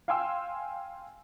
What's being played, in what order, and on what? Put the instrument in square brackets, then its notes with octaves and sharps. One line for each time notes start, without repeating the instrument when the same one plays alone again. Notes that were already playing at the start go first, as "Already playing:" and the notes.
[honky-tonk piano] F5 G5 G#5 C6 E6